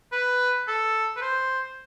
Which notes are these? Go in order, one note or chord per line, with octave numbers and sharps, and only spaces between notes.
B4
A4
B4
C5